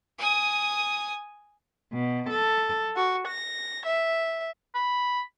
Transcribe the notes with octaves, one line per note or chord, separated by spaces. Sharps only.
G#5 D#6
B2
A4
F#4
A#6
E5
B5